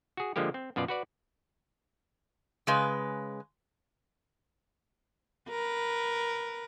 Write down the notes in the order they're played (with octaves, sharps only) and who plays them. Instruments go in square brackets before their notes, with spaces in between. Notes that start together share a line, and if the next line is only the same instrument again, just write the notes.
[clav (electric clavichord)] F#4 G#4
D3 F3 G#3 A#3 G4
C4
F#2 B2 F4 D5
F#4 B4 D5
[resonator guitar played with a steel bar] C#3 G#3 B4
[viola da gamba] A#4 B4